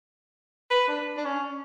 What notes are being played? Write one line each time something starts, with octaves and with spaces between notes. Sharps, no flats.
B4
D4
D4
C#4